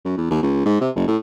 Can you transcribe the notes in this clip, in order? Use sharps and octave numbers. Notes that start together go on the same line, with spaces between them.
F#2
E2
D#2
C#2
G#2
C3
F#1
A2